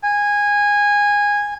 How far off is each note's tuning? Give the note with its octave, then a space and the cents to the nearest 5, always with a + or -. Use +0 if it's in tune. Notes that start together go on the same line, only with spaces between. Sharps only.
G#5 -15